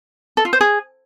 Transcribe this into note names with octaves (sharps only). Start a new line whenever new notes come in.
A4
F4
C5
G#4